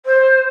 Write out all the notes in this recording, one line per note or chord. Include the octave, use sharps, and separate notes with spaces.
C5